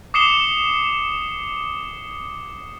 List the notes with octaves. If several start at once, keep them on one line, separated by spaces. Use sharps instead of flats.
D6 D#6 C7 C#7 E7 G7